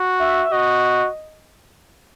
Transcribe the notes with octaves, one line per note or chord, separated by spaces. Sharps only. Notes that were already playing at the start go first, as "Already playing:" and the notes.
Already playing: F#4
E5
E5
F#4 D#5